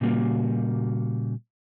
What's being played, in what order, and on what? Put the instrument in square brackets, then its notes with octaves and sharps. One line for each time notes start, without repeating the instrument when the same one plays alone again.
[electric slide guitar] A#2 C#3 G3 A#3 F#4